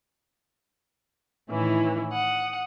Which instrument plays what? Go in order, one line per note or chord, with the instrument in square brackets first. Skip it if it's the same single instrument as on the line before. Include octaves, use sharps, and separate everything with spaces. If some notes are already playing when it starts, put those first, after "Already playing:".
[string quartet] A2 D#3 E3 C#4 E4
F#5 D#6